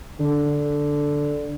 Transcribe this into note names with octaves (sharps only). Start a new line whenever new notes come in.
D3